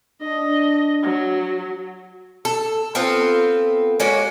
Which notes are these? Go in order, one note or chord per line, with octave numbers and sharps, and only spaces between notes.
D4 D#5
F#3
A4
B3 C4 F4 A4
G#3 A#3 C#4 F#4